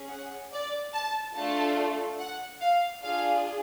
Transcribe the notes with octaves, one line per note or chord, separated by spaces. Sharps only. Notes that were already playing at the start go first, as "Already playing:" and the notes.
Already playing: C#4 G#4
F#5
D5
A5
A3 D4 F4 A4 A5
F#5
F5
D4 F4 G#4 F5